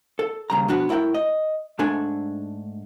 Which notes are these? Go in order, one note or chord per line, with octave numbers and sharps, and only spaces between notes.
A4
D#2 C#3 G3 A#5
B2 F3 B3 D4 F#4 B4
A2 E4 A#4 F5 G5
D#5
G#2 A3 D4 A4 G#5